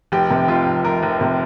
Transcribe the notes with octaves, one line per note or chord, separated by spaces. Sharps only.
F1 G4
C3
F1 F4
F1
F1 A#4
F1
C3